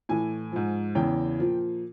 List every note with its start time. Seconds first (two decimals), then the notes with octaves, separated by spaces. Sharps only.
0.09 A2 E3 G#5
0.52 G#2 F3
0.95 E2 C#3 E3 G5
1.39 A#2 F3